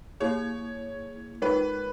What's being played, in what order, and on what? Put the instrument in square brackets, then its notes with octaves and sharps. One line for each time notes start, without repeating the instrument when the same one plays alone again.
[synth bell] A#3 E4 G#4 [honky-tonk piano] C#5
[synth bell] G#3 D#4 A#4 C#5 [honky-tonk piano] B4